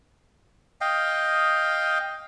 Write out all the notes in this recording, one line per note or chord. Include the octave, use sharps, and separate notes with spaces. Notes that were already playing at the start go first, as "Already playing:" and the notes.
D#5 F5 G5